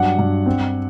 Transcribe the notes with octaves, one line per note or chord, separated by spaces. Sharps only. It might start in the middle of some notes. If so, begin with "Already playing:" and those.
Already playing: G2 F#3 F#5
G2
C4